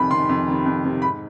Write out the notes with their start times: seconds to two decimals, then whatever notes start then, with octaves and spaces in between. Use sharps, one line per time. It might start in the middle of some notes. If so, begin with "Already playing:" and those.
Already playing: F2 C3 D#3 B5
0.11 C3 D#3 C6
0.29 F2
0.48 C3 D#3
0.66 F2
0.85 C3 D#3
1.02 G#2 B5